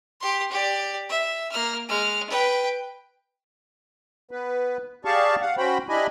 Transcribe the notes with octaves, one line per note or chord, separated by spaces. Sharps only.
G4 C6
G4 D5
E5
A#3 F6
G#3 F6
B4 G5
B3 B4
G4 G#4 D5 F5 A5 C#6
F5 F#5
C#4 F#4 C5 G5 B5
D4 E4 G4 D#5 G#5 B5